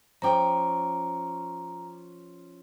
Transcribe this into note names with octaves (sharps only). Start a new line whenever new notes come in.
F3 C#4 G5 A#5 D6